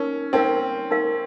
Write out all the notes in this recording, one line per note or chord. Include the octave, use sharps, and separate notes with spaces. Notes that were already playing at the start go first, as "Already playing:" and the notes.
Already playing: C#4 D#4 A#4
C4 D#4 A#4 F5
D#4 A#4 F5